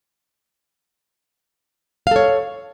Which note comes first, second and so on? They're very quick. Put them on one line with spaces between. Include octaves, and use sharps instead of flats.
F5 A4 C#5